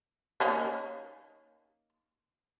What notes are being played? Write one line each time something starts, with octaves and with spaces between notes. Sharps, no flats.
A#3 C#4 D#4